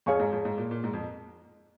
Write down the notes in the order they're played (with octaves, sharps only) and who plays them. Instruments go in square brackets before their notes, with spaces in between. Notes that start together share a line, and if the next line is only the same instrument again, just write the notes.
[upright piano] F2 [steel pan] G#4 C#5 F5 G#5 C#6
[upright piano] G#2
F2
G#2
A#2
A#2
G#2
F2